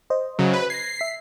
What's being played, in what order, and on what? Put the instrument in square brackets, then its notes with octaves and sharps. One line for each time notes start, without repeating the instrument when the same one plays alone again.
[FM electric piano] C5 D#5
[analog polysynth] C#3 F#3
B4
[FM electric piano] G#6 A#6 [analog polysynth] C7
[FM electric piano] E5 B6